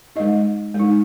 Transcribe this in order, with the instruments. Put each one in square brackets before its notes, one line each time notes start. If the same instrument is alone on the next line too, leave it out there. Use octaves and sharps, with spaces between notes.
[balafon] G#3 D#4 D#5
G#3 D#4